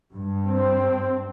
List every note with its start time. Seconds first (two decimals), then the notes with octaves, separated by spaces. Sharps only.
0.13 G2
0.46 C4